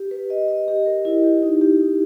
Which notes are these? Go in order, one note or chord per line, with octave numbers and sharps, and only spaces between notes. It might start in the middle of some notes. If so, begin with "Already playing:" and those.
Already playing: G4
B4
D#5
D#5
G4
A#4
E4
G4
D#4
G4
D#4